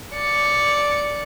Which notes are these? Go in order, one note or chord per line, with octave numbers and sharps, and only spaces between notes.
D5 C#7